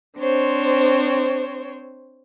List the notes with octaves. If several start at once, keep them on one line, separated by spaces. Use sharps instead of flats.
C4 D4 C5 C#5